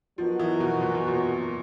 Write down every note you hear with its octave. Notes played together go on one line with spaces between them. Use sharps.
F3 F#3 B3 D#4 F#4 A#4
E3
B2
A#2
B2
A#2